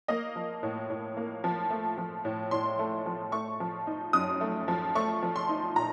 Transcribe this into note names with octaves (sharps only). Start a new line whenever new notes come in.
A#3 D#5
F3
A2
A2
A#3
F3
A3
F3
A2
A2 C6
A3
F3
A3 C#6
F3
D#4
F#2 D#6
A3
F3
A3 C#6
F3
C6
D#4
A#2 A#5